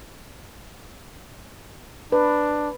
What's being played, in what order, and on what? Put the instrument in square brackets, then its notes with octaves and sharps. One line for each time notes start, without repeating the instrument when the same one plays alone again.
[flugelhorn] D4 [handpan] B4